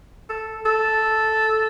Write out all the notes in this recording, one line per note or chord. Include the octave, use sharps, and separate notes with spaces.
A4
A4